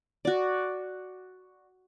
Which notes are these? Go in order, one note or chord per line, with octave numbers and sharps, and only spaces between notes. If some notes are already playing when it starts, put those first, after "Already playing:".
F#4 D5